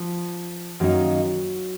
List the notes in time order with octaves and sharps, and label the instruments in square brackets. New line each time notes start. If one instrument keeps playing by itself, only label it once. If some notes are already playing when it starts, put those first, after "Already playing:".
Already playing: [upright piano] F3
[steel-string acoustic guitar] F#2 D#3 A#3 D#4 A#4 [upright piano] F#3